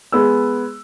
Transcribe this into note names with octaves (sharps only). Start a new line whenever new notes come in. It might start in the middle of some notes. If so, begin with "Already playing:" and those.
G#3 B3 E6